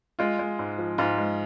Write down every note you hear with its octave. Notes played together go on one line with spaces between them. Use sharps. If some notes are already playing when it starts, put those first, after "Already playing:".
G#3 F4
G#3
G#2
F3
G#2 F4
G#3